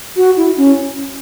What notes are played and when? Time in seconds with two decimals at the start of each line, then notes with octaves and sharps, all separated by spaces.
0.17 F#4
0.37 E4
0.57 C#4